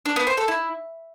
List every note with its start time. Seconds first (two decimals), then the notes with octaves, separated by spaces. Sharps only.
0.06 D4
0.16 B3
0.27 C5
0.37 A4
0.48 E4